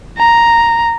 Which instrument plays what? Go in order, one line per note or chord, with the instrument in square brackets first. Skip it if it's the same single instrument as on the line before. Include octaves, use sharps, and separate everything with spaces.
[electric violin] A#5